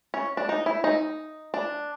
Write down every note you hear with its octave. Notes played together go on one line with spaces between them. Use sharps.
C#4
D4
D#4
E4
D#4
D4